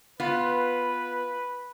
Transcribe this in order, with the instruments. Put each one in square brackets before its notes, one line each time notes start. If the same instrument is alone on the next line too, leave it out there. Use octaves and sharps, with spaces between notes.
[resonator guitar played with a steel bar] B3 F4 [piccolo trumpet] B4